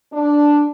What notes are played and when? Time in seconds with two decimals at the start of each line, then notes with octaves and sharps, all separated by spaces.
0.13 D4